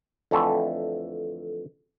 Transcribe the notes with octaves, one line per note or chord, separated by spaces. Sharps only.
F2 D3 E3 A3